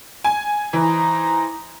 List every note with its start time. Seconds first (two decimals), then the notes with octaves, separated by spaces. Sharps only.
0.24 G#5
0.73 E3 D#4 C5 A#5